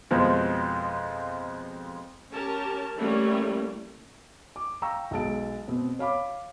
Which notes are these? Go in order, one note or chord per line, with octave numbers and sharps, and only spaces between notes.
F2 B2 F3 G#3
C#4 G4 A#4 A5
E3 G3 A3 A#3 C#4
D6
F5 G5 A#5 C#6 E6
B1 G#3 A5 D7
B2 C4
C#5 F5 B5 D6